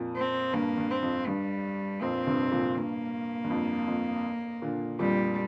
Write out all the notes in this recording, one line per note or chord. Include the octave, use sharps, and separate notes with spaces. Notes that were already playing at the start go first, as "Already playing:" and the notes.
Already playing: F2 A#2
C4
G2 A#3
G2
C4
F2
G2 G3
F2 A#2 C4
G2 C3
F2 A#2
G2 A#3
G2
F2
F2
A#2 D3
F2 A#2 G3